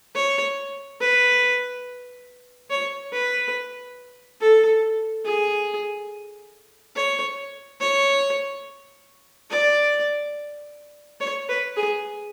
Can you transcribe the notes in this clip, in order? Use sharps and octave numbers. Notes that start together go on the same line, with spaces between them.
C#5
B4
C#5
B4
A4
G#4
C#5
C#5
D5
C#5
B4
G#4